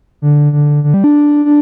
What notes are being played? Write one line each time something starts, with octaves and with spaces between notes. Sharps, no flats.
D3
D3
D3
G3
D4
D4